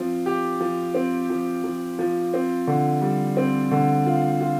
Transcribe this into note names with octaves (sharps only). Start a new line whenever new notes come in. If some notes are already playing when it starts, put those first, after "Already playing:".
Already playing: F3 C4
G4
F3
C4
F3
F3
F3
C4
D3
G3
C4
D3
F4
F4